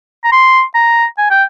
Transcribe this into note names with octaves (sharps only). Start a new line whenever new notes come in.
A#5
C6
A#5
G#5
G5